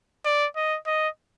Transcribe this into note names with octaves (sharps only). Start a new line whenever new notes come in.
D5
D#5
D#5